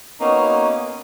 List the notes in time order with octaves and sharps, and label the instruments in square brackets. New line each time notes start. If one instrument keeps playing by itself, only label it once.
[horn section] A#3 B3 C#4 D#4 F#4